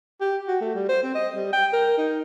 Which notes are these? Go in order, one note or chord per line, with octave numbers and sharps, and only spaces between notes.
G4
F#4
A3
G3
C5
C4
D#5
G3
G5
A#4
D#4